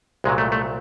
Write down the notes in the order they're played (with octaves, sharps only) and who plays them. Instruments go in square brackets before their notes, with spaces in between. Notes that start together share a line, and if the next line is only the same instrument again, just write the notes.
[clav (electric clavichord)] C2 A#2 F#3 G#3
A3
A3